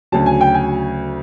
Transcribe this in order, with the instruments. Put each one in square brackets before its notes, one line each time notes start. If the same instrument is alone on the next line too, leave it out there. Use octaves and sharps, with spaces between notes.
[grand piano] D2 C#3 F#3 A5
G#5
G5
G#5